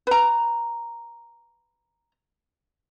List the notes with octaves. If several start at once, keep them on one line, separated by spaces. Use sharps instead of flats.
B4 A#5